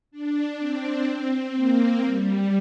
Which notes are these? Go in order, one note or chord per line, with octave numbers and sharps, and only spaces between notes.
D4
C4
A#3
G3